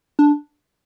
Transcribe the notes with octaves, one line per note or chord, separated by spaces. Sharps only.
D4